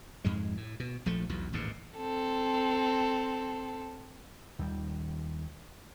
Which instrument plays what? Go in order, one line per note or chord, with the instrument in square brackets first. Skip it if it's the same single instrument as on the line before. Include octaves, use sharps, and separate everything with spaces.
[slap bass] F2 G#2 G#3
A2
B2
A#1 F3 A3
B1 E2 B2
A1 D#2 G#2 B2
[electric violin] C4 A4
[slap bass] D#2 D#3 G3